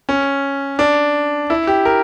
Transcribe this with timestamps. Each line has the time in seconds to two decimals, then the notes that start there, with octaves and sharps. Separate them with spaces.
0.09 C#4
0.79 D4
1.50 E4
1.67 G4
1.85 A#4